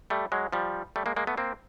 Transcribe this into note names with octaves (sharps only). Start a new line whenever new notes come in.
G3 A3
F#3 G#3
F3 G3
G3 A3
G#3 A#3
G#3 A#3
A3 B3
A#3 C4